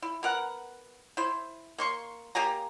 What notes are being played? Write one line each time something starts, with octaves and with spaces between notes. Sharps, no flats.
E4
B3 A#4 F#5
E4 C5
A#3 C6 C#6
A#3 G4 G#5 A#5